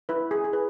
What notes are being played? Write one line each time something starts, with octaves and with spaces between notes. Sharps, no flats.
E4 B4
G#4
G#4
E4 B4